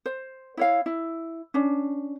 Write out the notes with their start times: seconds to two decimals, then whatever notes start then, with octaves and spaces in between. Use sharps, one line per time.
0.06 C5
0.57 E4 C#5 F5
0.86 E4
1.54 C#4 D4